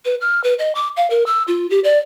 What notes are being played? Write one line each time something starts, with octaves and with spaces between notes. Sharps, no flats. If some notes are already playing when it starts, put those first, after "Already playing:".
B4
F6
B4
D#5
D6
F5
A#4
E6
F4
G4
D5